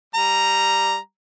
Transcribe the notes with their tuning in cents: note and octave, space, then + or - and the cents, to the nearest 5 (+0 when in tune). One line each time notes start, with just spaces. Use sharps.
G3 +0 A#5 +0